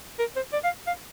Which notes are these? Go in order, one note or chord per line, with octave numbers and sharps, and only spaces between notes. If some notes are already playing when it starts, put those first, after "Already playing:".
A#4
C5
D5
F5
F5